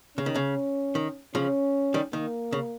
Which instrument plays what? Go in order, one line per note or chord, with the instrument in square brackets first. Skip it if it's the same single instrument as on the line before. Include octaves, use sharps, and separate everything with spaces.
[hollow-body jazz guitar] C#3 [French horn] C#4
[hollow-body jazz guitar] D#3
C#3
D#3
[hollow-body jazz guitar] C#3 F3 [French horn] C#4
[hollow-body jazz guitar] D#3 G3
[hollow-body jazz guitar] D#3 [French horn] A#3
[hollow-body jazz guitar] C#3